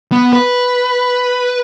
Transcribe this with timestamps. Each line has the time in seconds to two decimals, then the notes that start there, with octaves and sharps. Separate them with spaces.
0.12 B3
0.33 B4